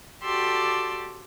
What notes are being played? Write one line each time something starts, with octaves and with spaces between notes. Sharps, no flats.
F#4 G4 A4 D5 C6 E6